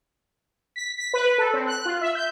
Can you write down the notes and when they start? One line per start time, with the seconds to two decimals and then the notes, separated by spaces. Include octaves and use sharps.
0.76 B6
0.98 B6
1.13 B4
1.38 A4
1.53 C4
1.67 F#6
1.85 F4
2.01 E5
2.15 G6